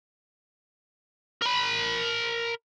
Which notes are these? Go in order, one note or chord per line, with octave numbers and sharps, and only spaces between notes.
A#4 B5